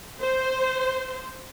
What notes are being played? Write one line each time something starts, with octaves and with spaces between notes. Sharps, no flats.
C5